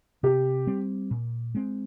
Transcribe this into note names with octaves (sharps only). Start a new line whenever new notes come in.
C3 G4
G3 C4
A#2
G#3 C4